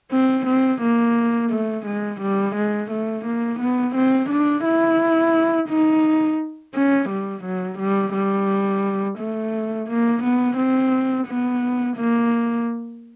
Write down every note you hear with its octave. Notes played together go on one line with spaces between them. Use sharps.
C4
C4
A#3
A3
G#3
G3
G#3
A3
A#3
B3
C4
D4
E4
D#4
C#4
G3
F#3
G3
G3
A3
A#3
B3
C4
B3
A#3